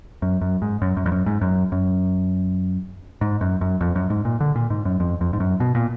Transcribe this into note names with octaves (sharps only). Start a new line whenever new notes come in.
F#2
F#2
G#2
F#2
F#2
F2
F#2
G#2
F#2
F#2
G#2
F#2
F#2
F2
F#2
G#2
A#2
D3
A#2
G#2
F#2
F2
F2
G#2
F#2
B2
A#2